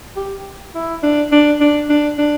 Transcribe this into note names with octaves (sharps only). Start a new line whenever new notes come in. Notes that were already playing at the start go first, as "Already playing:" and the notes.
G4
E4
D4
D4
D4
D4
D4